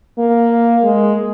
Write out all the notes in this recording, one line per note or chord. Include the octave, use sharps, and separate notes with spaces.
A#3
G#3